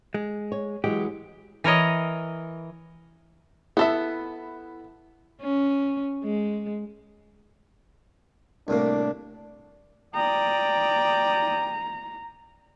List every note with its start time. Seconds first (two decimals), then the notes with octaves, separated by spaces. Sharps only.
0.14 G#3
0.52 C#5
0.84 E3 F#3 G#3 G4
1.64 E3 A#4 C#5 D#5
3.77 B3 E4 A4 E5
5.42 C#4
6.24 G#3
8.68 C2 A2 A#3 D4
10.15 D5 G5 A#5 D#6